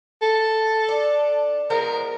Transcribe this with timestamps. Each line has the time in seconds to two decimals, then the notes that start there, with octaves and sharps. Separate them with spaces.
0.22 A4
0.88 D4
1.70 F3 G#3 B3 A#4